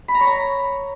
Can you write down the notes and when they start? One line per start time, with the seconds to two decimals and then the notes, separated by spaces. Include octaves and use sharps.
0.08 B5
0.15 A#5
0.21 C#5
0.27 A#5